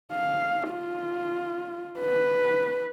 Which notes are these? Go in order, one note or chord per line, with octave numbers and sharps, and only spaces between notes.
F5
F4
B4